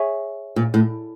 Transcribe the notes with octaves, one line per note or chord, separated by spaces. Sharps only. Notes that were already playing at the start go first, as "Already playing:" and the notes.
Already playing: G#4 C#5 E5 G#5 C#6
A#2
A2